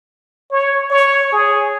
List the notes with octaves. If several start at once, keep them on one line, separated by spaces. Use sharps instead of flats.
C#5
C#5
G#4